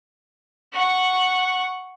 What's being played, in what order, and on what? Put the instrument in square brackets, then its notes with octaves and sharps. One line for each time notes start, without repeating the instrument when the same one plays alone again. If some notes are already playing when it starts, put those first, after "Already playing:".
[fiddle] F#5 C#6